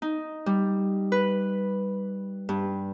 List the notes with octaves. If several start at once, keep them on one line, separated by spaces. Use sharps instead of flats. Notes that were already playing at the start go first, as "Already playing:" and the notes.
D#4
G3
B4
G2